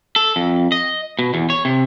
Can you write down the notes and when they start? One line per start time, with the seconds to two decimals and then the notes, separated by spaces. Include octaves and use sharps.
0.16 A4
0.36 F2
0.72 D#5
1.19 B2
1.34 E2
1.50 C#5
1.65 C3